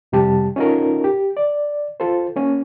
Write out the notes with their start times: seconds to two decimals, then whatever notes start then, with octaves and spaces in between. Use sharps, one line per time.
0.12 F2 C3 G3 G4 A5
0.56 C#4 D#4 F4 F#4 A4 A#4
1.04 G4
1.37 D5
2.00 F4 A4 C5
2.36 A#3 C#4 F#4